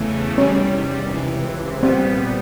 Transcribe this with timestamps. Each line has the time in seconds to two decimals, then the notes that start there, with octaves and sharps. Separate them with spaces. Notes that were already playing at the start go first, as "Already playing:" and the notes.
Already playing: E2 C#3 E3 A3
0.38 E2 C3 D#3 G3 C#4
1.10 C#2 C3 E3
1.83 A#2 G3 B3 C4